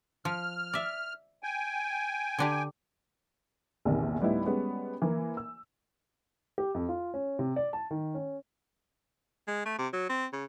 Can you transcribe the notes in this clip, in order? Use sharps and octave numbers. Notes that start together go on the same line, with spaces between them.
F3 F6
D5 E5
G5 G#5
D3 D4 G4
A#1 E2 C3 D#3
D2 A2 G3 B3 D#4 E4
G3 G#3 B3 C#4
E3 A#3
E6
G4
F2
F4
C#4
C3
D5
A5
D#3
C#4
G#3
A3
C3
F#3
C4
C#3